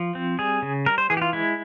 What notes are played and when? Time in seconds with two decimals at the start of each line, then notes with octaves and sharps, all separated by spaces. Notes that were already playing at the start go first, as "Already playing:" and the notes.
Already playing: F3
0.15 C4
0.39 G3 G#4
0.62 C#3
0.86 G3 A#4
0.98 C5
1.10 E3 G#4
1.17 G4
1.22 F4
1.33 G#3 E4